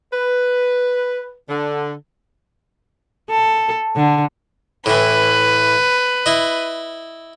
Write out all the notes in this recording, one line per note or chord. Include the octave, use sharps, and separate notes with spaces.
B4
D3
A4
D3
A2 E3 B4
E4 D#5